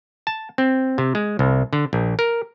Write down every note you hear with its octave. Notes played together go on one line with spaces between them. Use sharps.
A5
C4
C3
G#3
C2
D3
A#1
A#4